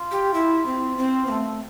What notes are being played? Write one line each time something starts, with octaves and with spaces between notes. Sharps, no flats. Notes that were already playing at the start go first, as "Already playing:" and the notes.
Already playing: F4
G4
E4
C4
C4
B3
A3